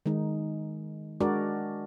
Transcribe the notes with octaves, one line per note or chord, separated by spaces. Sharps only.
D#3 G#3 D#4
G#3 D4 F#4 A#4 D5